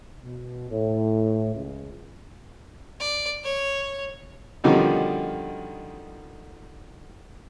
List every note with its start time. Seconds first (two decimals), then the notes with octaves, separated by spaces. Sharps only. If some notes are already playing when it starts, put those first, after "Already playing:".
0.23 B2
0.71 A2
1.55 C#2
3.00 D5
3.44 C#5
4.64 B2 D3 D#3 F3 G3 C#4